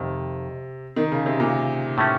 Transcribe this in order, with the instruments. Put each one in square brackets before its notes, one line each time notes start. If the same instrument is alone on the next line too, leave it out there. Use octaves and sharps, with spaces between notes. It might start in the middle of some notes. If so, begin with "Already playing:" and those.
Already playing: [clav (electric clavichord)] F2 D#3 [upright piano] C3
[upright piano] D#3
C#3
C3
A#2
[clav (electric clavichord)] A2 A3 C#4